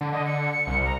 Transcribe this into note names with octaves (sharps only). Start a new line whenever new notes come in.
D3
D3 D#5
C#7
C2
A#5